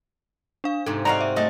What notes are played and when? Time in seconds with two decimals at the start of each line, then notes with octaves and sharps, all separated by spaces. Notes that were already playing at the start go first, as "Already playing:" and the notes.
0.64 D4 F5
0.86 G#2 C3 A4
1.05 C4 F#4 D5 D#5 F5 A#5
1.21 E5
1.36 A3 D#5 A5